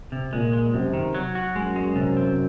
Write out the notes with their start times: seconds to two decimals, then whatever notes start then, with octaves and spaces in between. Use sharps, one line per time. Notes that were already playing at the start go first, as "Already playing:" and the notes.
0.12 C3
0.32 A#2 G#3
0.53 G#3
0.74 F#2 C3
0.93 D#3
1.15 F#3
1.35 F#4
1.55 F#2 G#3
1.76 G#3
1.96 C3
2.17 C4